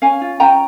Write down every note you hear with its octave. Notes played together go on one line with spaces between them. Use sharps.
C#4 F5 G#5
F4
C#4 G5 A#5